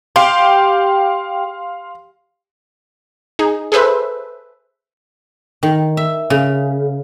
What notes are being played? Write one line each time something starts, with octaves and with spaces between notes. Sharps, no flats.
G4 F5 C6
D#4 G#4
G#4 A4 B4 C5 E5
D#3
E5
C#3